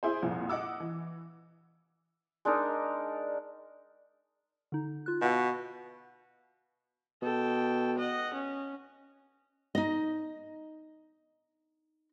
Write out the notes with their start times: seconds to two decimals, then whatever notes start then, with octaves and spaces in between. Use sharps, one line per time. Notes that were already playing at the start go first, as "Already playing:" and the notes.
0.03 E4 G#4 C5
0.22 C2 F2 A#2
0.49 D#5 F#5 D6 E6
0.80 E3
2.45 G#3 D4 D#4 A#4
4.72 D3 D#4
5.06 F4 F#6
5.21 B2 D#5 F5 F#5
7.23 B2 A4 G5
7.98 D#5 F#5
8.34 C#4
9.75 D#4 D#5